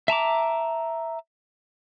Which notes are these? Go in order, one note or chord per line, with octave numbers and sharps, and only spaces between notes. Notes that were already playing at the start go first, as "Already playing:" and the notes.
E5 A5 A#5 D6